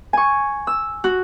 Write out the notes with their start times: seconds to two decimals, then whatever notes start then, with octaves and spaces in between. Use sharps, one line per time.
0.13 G#5 C#6
0.67 E6
1.04 F#4